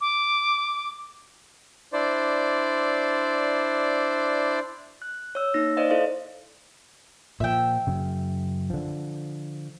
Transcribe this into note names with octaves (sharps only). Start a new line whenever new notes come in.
D6
D4 E4 C5 D5
F#6
C#5 E6
A#3 D#4 A#6
C5 D5 D#5 F5
E4 A4 C5 D#5 F5
A#2 F3 E5 G5
F#2 C#3
D3 F3